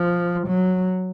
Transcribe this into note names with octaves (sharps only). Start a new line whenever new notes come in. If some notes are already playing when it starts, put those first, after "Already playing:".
Already playing: F3
F#3